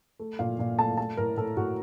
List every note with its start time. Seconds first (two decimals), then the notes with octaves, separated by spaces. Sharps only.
0.20 A3
0.39 A#2 F5
0.59 A#2
0.78 A3 A5
0.97 A3 A5
1.17 A2 A#4
1.37 A2 A4
1.57 A2 F#4